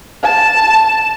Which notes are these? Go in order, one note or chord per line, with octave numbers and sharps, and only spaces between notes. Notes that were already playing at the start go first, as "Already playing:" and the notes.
A5